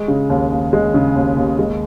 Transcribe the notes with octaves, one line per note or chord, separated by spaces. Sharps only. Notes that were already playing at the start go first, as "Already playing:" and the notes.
Already playing: G#3
C#3
D#2
D#2
G#3
C#3
D#2
D#2
G#3